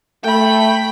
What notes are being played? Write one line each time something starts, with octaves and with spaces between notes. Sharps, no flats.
A3 G5 B5